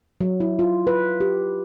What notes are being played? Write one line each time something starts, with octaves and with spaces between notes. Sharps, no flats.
F#3
E4
F4
B4
G4